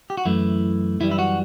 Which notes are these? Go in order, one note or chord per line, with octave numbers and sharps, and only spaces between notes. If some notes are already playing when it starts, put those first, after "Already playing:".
G4
F#4
F#2 E3 A3 E4
F#2 E3 G3 E4
E4
F#4